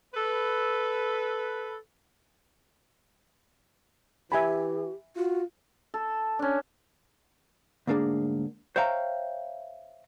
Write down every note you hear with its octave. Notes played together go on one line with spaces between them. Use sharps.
A4 B4
E3 G4 E5 G#5 B5
F4 F#4
A4
C#4 D4
D2 G#2 A#3 D4 G#4
C5 C#5 E5 F5 G5 A#5